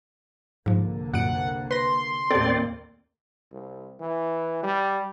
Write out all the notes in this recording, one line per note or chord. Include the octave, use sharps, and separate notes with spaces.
C2 G#2 D3 F3 A#3
F#2 A#2 F#5 D7
B4 C6 A#6
D#2 A2 A#3 C4 G4 A4 D5
C2
E3
G3